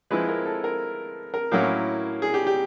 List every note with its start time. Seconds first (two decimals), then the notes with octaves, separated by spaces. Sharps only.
0.10 F3 G#3 C4 E4 B4
0.29 A#4
0.45 A4
0.64 A#4
1.34 A#4
1.52 A2 F#3 A#3 C#4 E4
2.22 G#4
2.34 G4
2.47 G4